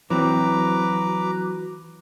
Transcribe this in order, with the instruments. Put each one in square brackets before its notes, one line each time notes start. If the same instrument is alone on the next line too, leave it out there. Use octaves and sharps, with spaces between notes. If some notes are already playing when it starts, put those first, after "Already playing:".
[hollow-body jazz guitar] E3 C4 [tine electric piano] F#3 [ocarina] F#4 [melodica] B4 A#5 D6